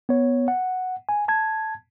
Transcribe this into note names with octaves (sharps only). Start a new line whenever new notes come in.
B3 C#5
F#5
G#5
A5 G#6